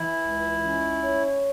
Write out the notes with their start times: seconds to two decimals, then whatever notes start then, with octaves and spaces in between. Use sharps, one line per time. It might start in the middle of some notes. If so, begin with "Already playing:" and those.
Already playing: E3 E4
0.22 C#2
0.62 C#4
1.01 C#5